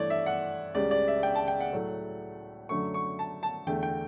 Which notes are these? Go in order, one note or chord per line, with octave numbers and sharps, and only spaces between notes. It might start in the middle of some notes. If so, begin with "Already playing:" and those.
Already playing: G2 E3 A3 C#5 D5
E5
F#5
C#2 C#3 G3 D5
D5
E5
G5
A5
G5
F#5
A2 F#3 A3
F#2 D3 F#3 A3 C#6
C#6
A5
A5
E2 D3 A3 G5
G5